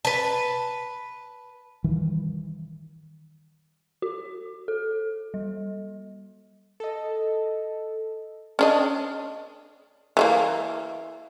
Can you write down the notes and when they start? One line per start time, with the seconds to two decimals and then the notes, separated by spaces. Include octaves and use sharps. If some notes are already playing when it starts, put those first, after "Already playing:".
0.05 B4 A5
1.84 D#3 E3 G3
4.02 F#4
4.68 A4
5.34 G3
6.80 A4 D#5
8.59 C#4 D4 D#5
10.17 E3 G#3 A#3